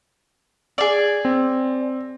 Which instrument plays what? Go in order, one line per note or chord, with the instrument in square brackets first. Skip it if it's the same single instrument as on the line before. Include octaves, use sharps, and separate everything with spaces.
[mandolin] G#4 D5
[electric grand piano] C4